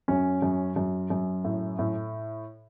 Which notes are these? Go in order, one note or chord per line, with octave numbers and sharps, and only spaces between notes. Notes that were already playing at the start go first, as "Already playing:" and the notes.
F#2 C#4
F#2
F#2
F#2
A2
A2